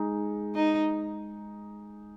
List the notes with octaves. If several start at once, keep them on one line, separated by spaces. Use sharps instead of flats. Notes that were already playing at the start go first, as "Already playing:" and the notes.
Already playing: G#3 D#4 G#4
D#4